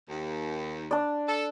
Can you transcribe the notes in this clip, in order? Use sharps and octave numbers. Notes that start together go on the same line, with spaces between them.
D#2
D4 D5
A4